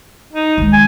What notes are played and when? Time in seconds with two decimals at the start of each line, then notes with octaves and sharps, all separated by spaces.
0.33 D#4
0.57 D#3 G#3
0.73 G#5